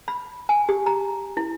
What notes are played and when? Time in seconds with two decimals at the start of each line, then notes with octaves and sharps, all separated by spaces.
0.08 B5
0.49 G#5
0.69 G4
0.86 A#5
1.37 E4